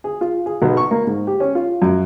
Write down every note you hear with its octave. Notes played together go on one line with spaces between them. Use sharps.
G#4
F4
G#4
B1
C#6
A#3
G#2
G4
C#4
F4
F#2